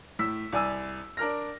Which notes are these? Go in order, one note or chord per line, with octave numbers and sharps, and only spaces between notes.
A2 E6 B6
C2 D5 G#5 E6
D4 A#4 F6 A#6